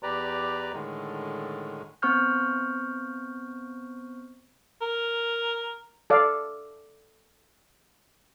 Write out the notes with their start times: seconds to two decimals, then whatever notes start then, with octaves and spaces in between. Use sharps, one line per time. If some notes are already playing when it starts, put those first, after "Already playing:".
0.03 E2 G4 B4 D5 A#5
0.73 A2 D3 D#3 G#3
2.02 B3 C4 C5 C#6 F6 G6
4.82 A#4
6.10 A4 D5 F5